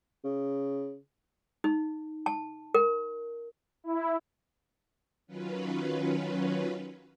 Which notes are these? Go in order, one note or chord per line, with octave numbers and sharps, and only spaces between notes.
C#3
D#4
A5
A#4
E4
D#3 F#3 C#4 F4 B4